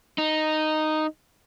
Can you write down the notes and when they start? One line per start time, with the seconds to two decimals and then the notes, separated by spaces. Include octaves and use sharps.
0.18 D#4